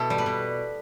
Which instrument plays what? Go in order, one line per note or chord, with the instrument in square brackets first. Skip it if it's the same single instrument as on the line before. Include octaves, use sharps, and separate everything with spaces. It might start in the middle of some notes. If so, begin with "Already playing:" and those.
Already playing: [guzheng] B2 E4 A4
G3
B4
B2